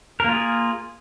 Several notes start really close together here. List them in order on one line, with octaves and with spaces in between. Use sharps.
A#4 A#3 F4 G#4